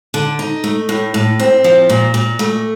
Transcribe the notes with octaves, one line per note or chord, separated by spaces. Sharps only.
D3
D#4
A3
A2
A2
C4
F3
A#2
A#2
A3